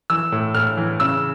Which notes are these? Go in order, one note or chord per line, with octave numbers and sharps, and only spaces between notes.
E3 E6
A2
A2 F6
E3
C#3 E6